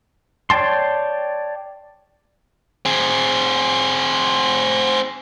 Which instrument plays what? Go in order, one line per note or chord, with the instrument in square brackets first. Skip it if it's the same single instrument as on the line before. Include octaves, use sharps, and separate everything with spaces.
[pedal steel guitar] C#5 D5 G5 A5 C6
[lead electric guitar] C4 G#4